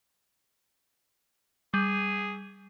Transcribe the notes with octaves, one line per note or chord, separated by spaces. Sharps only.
G3 G#4